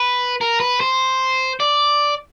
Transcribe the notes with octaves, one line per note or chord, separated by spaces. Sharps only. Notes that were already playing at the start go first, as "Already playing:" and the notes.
Already playing: B4
A#4
B4
C5
D5